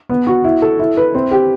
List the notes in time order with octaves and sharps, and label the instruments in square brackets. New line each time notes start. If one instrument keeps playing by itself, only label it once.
[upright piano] B3
F#4
E4
A4
E4
B4
C4
G4